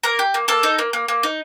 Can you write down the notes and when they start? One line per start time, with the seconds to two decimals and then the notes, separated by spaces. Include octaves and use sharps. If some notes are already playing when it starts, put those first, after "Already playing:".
0.03 A#3 A#4 A#5
0.19 G4
0.34 A#3
0.48 A#3 A4 A5
0.63 D#4
0.79 A#3
0.93 A#3
1.08 A#3
1.23 D#4